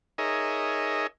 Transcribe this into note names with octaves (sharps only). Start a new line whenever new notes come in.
D#4 G#4 A#4 C#5 D#5 E5